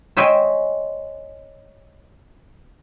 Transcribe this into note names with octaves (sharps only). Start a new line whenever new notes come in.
C5 C#5 D#5 E5 G5 G#5